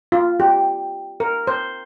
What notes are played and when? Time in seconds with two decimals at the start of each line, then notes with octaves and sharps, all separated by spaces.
0.12 F4
0.40 G4
1.20 A#4
1.47 C5